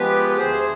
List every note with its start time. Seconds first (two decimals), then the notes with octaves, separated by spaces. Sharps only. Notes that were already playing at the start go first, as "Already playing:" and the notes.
Already playing: F3 G#3 B3 G4 B4
0.29 B4
0.37 D2 G#4 C5